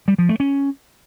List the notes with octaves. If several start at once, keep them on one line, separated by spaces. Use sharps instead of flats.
G3
F3
A3
C#4